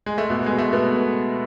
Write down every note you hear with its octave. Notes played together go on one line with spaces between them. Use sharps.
G#3
A3
B2 B3
G#3
B2
A3
B2 B3